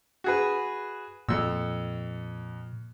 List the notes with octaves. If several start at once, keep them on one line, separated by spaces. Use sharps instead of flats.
F#4 G#4 B4
F2 A#2 E6